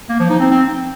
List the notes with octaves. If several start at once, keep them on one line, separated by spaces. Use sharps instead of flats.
A#3
F3
D#4
C4
C4